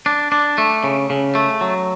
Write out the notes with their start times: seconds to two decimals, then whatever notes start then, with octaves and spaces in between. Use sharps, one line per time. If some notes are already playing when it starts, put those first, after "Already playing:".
0.06 D4
0.32 D4
0.58 A3
0.84 C#3
1.10 C#3
1.35 A3
1.61 F#3